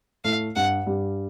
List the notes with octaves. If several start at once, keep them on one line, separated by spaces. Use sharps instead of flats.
A2 A3 F5
G2 G3 F#5
G2 G3